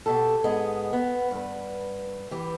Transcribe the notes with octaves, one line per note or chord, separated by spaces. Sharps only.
B2 G4 A4
G#2 B3 G#4 D#5
B3
G2 B4
E3 G4